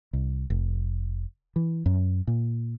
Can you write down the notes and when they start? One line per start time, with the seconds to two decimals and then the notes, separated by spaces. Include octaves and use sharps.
0.13 C2
0.50 F1
1.56 E3
1.86 F#2
2.27 A#2